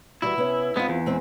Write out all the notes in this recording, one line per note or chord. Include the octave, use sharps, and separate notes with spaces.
E3 G3 E4 F#4
C3 B3 C#4
G#3 B3 C4 D#4 F4
E2
G#3 C4 C5